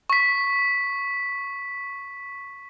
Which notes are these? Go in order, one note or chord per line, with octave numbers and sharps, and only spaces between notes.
C#6 B6